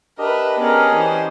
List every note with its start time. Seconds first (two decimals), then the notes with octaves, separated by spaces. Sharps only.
0.18 D4 G4 A#4 B4 D#5 E5
0.60 B3 C#4 G#4 A#4 D5 A#5
0.95 E3 C5